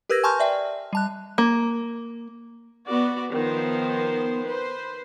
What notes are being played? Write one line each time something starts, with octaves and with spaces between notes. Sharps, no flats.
G4 A#4 B4 E6 G#6 A#6
G#5 A5 C6 C#6 F6 G6
D5 E5 G5
G3 A5 F#6
A#3
B3 F#4 D5
D#3 F3 B3 C5
B4 C5